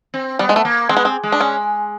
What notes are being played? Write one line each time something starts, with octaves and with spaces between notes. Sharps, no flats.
C4
G3 B3
G#3
A3
A#3
G#3 C4
B3
C4
G#3
D4
C#4